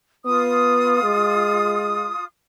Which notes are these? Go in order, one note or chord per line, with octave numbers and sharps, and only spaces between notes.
B3 F4 D#6
G#3